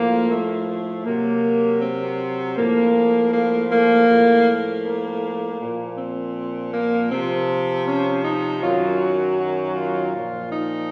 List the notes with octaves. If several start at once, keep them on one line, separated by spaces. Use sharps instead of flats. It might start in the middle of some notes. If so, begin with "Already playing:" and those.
Already playing: A2 F3 A#3
A3
C3 F#3 A#3
C4
A2 F3 A#3
A#3
A#3
A2 F3
A#3
A#2 F3
C4
A#3
C3 F3 C4
C#4
D#4
F#2 D#3 F#3 F4
F#4
F#4
F4
A#2 F3
D#4